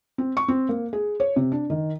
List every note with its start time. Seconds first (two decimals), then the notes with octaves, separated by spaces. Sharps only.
0.18 C4
0.37 C#6
0.48 C4
0.69 A#3
0.93 G#4
1.20 C#5
1.36 C3
1.52 D4
1.70 D#3